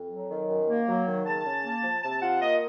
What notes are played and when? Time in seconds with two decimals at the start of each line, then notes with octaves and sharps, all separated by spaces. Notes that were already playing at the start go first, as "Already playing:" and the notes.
Already playing: F2
0.10 F#3
0.30 D#3
0.49 F#2
0.68 A#3
0.88 F#3
1.07 D#3
1.26 C#3 A5
1.45 C#3
1.64 A#3
1.83 F3
2.03 C3 A5
2.22 F4 F#5
2.42 A#3 D#5